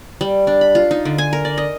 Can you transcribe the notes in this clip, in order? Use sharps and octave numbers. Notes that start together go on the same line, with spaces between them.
G3
D4
B5
F4
D#4
D3
G#5
A#4
D5
D#5